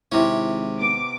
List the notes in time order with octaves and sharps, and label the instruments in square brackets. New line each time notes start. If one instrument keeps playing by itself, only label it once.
[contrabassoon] G#1 [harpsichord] C3 C#4 [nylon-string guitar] E4
[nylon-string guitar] B3 [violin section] D6